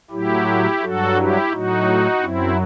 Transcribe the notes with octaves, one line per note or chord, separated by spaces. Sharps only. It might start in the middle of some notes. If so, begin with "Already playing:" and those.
A2 F#3 E4 G4
G2 F#3 F#4 A4
E4 G4
A2 F#3 D#4 F#4
F#2 F#3 C4 E4